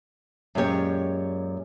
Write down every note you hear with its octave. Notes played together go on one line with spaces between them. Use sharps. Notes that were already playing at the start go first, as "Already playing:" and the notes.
F#2 A#2 G#3 F4 G4 C#5